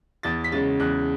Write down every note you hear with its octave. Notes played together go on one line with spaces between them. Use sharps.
E2 A6
B6
C#3 G#3 A6
E2 F#6